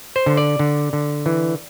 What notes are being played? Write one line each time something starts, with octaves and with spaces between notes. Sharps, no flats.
C5
D3
D5
D3
D3
E3